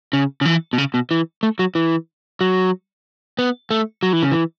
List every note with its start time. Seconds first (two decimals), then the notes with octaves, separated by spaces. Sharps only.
0.13 C#3
0.41 C#3
0.45 E3
0.73 B2
0.78 C#3
0.94 B2
1.11 E3
1.43 A3
1.59 F#3
1.75 E3
2.41 F#3
3.39 B3
3.71 A3
4.03 F#3
4.13 E3
4.23 C#3
4.32 E3